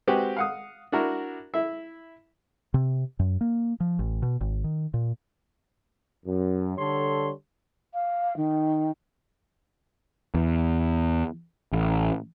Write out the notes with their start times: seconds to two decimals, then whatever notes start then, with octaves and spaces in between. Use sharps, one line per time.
0.07 G#3 C4 F#4 G4 B4
0.37 F5 F#5 D#6
0.92 D4 E4 F#4 A#4
1.54 E4 E5
2.74 C3
3.19 F#2
3.41 A#3
3.80 F3
3.99 A1
4.23 B2
4.41 G#1
4.64 D#3
4.94 A#2
6.26 F#2
6.78 D3 G3 A4 C#5 C6
7.93 F5
8.36 D#3
10.34 E2
11.73 A1